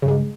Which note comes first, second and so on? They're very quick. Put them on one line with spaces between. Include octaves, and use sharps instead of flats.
C#3 G2 G#3